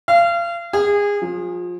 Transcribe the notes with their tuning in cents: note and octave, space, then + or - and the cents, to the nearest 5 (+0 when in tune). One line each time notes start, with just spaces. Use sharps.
F5 -30
G#4 -25
F3 +25